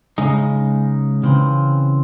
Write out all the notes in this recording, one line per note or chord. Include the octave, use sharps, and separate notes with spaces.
C#3 G#3 D#4
C#3 E3 C4